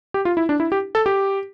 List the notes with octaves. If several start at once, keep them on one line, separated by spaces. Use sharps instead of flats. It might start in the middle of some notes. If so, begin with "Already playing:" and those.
G4
F4
E4
D4
E4
G4
A4
G4